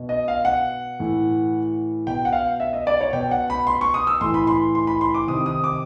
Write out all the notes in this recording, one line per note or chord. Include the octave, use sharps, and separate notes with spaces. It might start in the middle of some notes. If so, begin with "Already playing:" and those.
Already playing: B2
D#5
F5
F#5
A2 E3
B2 G5
F#5
F5
E5
D#5
D5
C#5
B2 G5
F#5
B5
C6
C#6
D#6
E6
A2 E3 C6
B5
C6
C6
B5
C6
D6
C3 D#3 D#6
D#6
D6